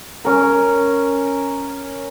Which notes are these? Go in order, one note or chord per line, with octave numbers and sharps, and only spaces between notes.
C#4 A#4